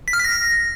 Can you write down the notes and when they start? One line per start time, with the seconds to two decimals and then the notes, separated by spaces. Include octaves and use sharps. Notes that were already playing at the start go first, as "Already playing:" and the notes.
0.08 B6
0.13 F6
0.19 B6
0.25 A#6